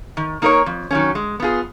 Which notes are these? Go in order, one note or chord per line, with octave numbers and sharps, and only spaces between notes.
D#3
A#3 D#4 A#4 C#5
F2
D#3 F#3 A#3 C#4
G#3
B3 F4 G#4